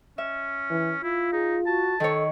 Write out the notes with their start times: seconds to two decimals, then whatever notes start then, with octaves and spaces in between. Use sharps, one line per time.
0.18 C#4 E5
0.70 E3
1.03 E4 F4
1.32 D#4 G#4
1.66 F#4 A5
2.00 D#3 A4 C#5